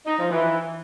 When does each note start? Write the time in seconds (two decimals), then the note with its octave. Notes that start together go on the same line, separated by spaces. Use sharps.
0.06 D#4
0.18 F3
0.30 E3